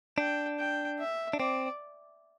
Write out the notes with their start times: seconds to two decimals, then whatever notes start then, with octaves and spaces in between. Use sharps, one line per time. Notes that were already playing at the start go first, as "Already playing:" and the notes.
0.18 D4 G5
0.58 G5
0.99 E5
1.33 D4
1.39 C4 D5